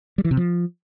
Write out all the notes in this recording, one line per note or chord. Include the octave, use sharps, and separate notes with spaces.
G3
E3
C3
F3